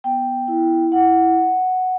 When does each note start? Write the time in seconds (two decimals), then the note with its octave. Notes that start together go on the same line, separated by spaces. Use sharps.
0.04 B3 G5
0.48 E4
0.92 E4 F#5